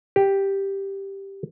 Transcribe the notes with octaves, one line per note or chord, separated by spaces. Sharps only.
G4